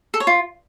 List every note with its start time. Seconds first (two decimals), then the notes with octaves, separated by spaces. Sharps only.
0.14 A4
0.20 C#5
0.27 F4